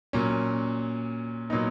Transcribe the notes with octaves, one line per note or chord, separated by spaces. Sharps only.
A#2 F#3 C#4
A#2 F#3 B3 D#4